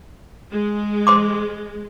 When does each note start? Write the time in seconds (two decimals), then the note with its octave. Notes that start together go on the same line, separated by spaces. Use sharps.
0.51 G#3
1.07 C5 C6 D6